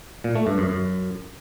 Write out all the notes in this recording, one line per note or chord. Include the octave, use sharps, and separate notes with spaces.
A#2
A3
G2
F#2
F#2